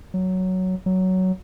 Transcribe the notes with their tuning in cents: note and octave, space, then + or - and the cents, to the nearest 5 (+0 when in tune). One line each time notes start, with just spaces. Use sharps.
F#3 +5
F#3 +10